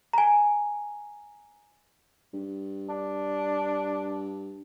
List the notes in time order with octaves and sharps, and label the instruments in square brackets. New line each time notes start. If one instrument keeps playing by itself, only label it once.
[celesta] G#5 A#5
[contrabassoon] G2
[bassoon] D4